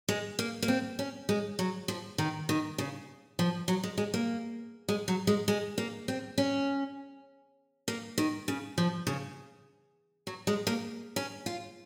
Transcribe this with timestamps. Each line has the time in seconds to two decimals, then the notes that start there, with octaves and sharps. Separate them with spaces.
0.09 G#3
0.39 A#3
0.62 A#3
0.68 C4
0.99 C#4
1.29 G#3
1.59 F#3
1.88 F3
2.18 D#3
2.49 D#3
2.78 C#3
3.39 F3
3.68 F#3
3.84 G#3
3.98 G#3
4.14 A#3
4.89 G#3
5.08 F#3
5.27 G#3
5.48 G#3
5.78 A#3
6.08 C4
6.38 C#4
7.88 A#3
8.18 D#3
8.48 C#3
8.78 F3
9.07 C#3
10.27 F#3
10.47 G#3
10.67 A#3
11.16 C#4
11.46 F4